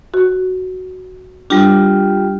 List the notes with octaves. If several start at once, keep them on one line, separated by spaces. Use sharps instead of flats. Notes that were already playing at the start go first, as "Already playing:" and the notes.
F#4
G3 D4 F4 G4 G5